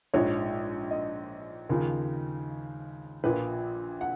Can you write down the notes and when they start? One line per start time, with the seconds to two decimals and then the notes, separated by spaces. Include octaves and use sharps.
0.14 A#1 G#2 F3 C#5
0.91 D#5
1.69 D#2 C#3 F3
3.24 A#1 A#2 F3 B4
4.01 F#5